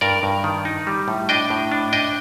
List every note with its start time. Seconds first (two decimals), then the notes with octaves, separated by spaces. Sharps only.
0.01 G2 A#4 D5
0.23 G2
0.44 D#3
0.65 D#4
0.87 G3
1.08 A2
1.29 D4 D#5 G5
1.50 A2
1.72 D4
1.93 D4 D#5 G5